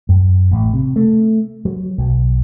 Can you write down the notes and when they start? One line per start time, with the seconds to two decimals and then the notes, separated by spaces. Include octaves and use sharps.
0.09 F#2
0.51 A1
0.74 C3
0.96 A3
1.65 F#3
1.98 B1